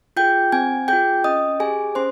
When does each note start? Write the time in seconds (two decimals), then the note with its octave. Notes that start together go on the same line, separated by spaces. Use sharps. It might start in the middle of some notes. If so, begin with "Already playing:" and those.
0.16 F4 G#4 G5 G6
0.52 C4 G#5 G#6
0.88 F4 G#4 G5 G6
1.24 C#4 D#5 D#6
1.60 G4 G#4 G#5
1.95 C#4 C5 C6